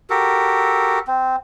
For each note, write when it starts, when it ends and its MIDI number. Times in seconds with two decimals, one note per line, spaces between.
0.10 0.99 66
0.10 0.99 67
0.10 0.99 69
0.10 0.99 70
1.07 1.36 60